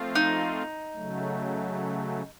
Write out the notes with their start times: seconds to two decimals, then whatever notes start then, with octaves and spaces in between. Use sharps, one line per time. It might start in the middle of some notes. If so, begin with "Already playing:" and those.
Already playing: F3 A3 C4 F4
0.15 D#4
0.95 C#3 F#3 A3